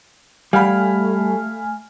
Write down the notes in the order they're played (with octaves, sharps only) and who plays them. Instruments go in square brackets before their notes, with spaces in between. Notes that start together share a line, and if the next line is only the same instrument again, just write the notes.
[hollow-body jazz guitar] G3 [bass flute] A3 [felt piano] F5 F#5 B5 [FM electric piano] G#5 F6